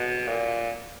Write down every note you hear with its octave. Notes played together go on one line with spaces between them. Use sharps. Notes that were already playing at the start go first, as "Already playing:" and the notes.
Already playing: B2
A#2